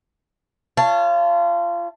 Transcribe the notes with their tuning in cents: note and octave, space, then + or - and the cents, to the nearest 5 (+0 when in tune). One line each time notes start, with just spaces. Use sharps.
F4 -25 C#5 +0 A5 +5